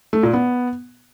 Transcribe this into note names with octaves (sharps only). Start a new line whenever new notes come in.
A3
A#2
B3